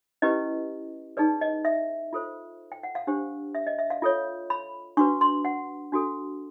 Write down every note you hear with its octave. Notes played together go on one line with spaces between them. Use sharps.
C#4 E4 G4 B4 D#5
D#4 G#4 B4 D5
D#5
E5
F4 A4 C5
G5
F#5
F5
D4 G4 C5
E5
D#5
E5
F5
F4 A4 C#5
B5
D4 F#4 B4 C#6
C6
F#5
D4 F#4 A4